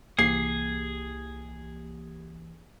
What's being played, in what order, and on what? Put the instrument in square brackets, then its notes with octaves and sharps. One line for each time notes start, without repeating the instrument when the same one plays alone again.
[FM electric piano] C2 E3 G4 [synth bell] A#3 [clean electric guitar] G#4 [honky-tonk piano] C7